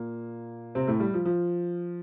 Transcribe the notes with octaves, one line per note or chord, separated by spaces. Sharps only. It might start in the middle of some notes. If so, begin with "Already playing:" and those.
Already playing: A#2 A#3
C3 C4
A2 A3
G3
F3
F3